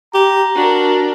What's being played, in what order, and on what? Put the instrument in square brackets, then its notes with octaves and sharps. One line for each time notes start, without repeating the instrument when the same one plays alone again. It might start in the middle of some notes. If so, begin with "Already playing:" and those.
[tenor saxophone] G4 [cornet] A#5
[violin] D4 A#4 [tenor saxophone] F#4